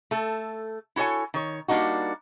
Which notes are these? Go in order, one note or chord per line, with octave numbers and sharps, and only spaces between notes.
A3 A4
E4 F#4 A4 C#5 G#5
D#3 C#5
G3 A#3 D4 D#4 F#4